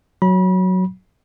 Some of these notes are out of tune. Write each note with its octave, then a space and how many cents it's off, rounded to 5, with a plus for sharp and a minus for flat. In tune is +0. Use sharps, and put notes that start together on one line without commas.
F#3 +0 B5 -35